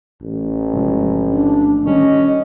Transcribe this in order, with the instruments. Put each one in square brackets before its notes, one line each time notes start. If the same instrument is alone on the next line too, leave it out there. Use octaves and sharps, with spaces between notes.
[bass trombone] A1
[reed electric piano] G#2 C3 F3
[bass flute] D4
[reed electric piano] D#3 G3 [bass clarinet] C#4 [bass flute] D#5